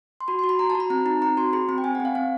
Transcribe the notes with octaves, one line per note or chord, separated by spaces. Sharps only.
C6
F#4 B5
F#4 C6
B5
F#4 A#5
A5
F#4
B5
C4 A#5
D#4 A#5
C4 A#5
F#4 C6
G#4 B5
C4 B5
G5
C4 G#5
F#5
C4
F5
C4 F5